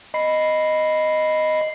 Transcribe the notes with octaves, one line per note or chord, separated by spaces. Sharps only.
D#5 B5 C7